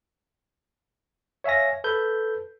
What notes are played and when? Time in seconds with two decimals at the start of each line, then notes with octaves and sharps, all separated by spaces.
1.44 C#5 E5 F5 G#5 A#6
1.84 A4 B4 G6